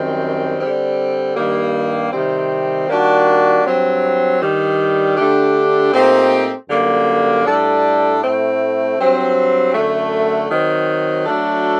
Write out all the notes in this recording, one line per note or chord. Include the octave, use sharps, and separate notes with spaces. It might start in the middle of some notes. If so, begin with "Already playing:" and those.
Already playing: F#2 D#3 G3 C4
D3 G3 C4
G2 D#3 G3 A#3
C3 D#3 G3 C4
D#3 G3 A#3 D4 F#4
G2 F#3 C4
G2 D#3 G3
D3 A3 D4 G4
A#2 A3 C4 D#4 G4
F#2 D3 G3 A#3
A2 G3 D4 A4
A2 A3 C4
G2 F#3 C4
F#2 D3 A3
D#3 F#3 C4
F#3 A3 D4 F#4 A4